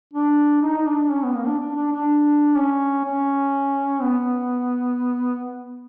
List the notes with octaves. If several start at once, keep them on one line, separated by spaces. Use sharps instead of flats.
D4
D#4
D#4
D4
C#4
B3
A#3
D4
D4
D4
D4
C#4
C#4
B3